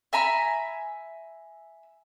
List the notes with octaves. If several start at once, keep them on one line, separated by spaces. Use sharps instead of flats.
E5 G#5 A#5 B5